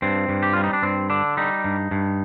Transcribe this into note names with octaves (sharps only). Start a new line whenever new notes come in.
G2 C4
G2
G4
G3 F4
D#4
D4
G2 C4
D3 D4
G3 D#4
G2
G2